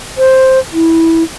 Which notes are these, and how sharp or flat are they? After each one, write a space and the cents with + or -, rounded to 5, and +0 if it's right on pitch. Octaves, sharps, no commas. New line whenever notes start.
C5 +5
E4 -10